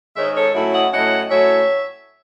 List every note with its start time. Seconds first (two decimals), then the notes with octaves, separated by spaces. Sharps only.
0.16 G#2 D#3 G#3 D#4 C#5 E5
0.35 A4 C#5
0.54 A2 F#3 C#4 E4
0.73 D#5 F#5
0.92 A2 F#3 C#4 E4 D#5 F#5
1.30 A2 F#3 C#4 E4 C#5 E5